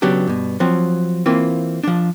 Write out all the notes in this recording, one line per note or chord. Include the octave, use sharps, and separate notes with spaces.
C#3 F#3 B3 D4 G4
G2 B2
F3 F#3 C4
E3 A#3 C4 F4
F3 D4